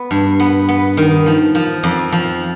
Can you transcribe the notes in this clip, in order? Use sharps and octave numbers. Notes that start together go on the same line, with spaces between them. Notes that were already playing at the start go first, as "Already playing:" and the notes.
Already playing: B3
G2
B3
B3
D#3
F3
F3
F2
F3